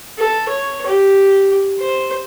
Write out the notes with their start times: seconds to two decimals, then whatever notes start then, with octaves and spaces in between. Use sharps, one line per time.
0.19 A4
0.48 C#5
0.86 G4
1.80 C5